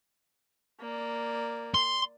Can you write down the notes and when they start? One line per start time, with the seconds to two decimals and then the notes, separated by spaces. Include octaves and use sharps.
0.80 A#3 D5
1.75 C6